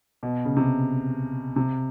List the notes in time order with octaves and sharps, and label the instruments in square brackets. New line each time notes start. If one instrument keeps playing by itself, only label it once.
[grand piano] B2
C#3
C3
C3